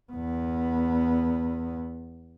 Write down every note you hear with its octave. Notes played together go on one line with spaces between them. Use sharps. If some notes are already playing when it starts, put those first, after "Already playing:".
E2 B3